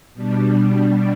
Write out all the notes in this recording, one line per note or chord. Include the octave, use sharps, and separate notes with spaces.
B2 G3 D4